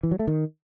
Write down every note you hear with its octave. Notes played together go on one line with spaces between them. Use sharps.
E3
F#3
A3
D#3